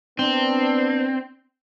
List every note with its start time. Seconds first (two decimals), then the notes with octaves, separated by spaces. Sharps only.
0.19 B3 C4 D4